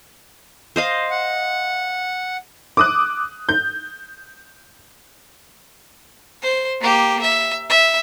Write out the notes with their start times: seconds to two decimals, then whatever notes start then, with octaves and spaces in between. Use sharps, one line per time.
0.76 C5 D#5 F5
1.11 F#5
2.77 D6 D#6 F#6
3.49 G6
6.42 C5
6.81 A#3 G4
7.22 E5
7.70 E5